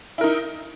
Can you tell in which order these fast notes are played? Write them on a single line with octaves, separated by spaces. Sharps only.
E4 A#4 D#4